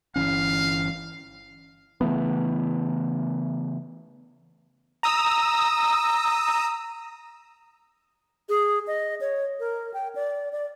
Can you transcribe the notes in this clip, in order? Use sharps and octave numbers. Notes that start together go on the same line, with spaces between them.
G1 E3 C#4 F5
C#3 E3 A3 B3
A#5 D#6 E6
G#4
D#5
C#5
A#4
G5
D5
D5